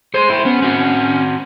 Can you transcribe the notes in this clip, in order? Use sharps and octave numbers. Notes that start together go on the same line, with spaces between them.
G#4 C5 C6
E4 G5
B3 C#4
C4 F#4